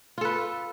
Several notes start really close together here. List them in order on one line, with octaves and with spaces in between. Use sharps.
F4 A4 B4